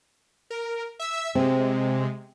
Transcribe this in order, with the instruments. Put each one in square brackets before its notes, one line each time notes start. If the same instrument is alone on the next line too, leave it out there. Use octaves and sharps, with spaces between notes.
[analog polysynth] A#4
E5 E6
[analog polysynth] C3 G#3 [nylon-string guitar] C4